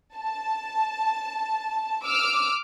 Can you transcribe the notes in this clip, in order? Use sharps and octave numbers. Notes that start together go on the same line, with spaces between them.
A5
D6 E6 F6